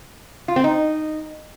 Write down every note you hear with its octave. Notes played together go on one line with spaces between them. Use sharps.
F4
C4
D#4